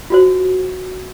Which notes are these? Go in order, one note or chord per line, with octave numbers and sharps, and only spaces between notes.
F4 F#4 C5